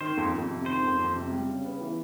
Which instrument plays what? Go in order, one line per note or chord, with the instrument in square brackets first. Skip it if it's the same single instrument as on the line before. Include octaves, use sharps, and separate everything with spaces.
[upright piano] D#3 [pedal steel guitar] C5
[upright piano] F2
F2
C3
[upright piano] D#3 [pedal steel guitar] C5
[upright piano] F2
F2
C3
G3
C#3
B3
E3